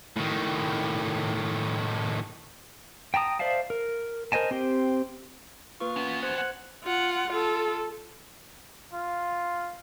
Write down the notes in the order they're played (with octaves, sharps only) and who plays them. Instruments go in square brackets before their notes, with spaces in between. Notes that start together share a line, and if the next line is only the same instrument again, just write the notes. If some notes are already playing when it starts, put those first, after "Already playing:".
[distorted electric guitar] A2 D#3
[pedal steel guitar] G5 A5 A#5 D#6
C5 D5 E5 F5 A5
A#4
A#4 C5 D#5 G#5 A5
C4 G4 C5
[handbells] A#3 B4 C#6 [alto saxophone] F4
[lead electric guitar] E2 B3 [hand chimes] C#4
[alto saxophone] F#4 [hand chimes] C5 [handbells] C6 G#6
[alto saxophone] F#5
[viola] F4 F#5
F4 A4
[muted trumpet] F4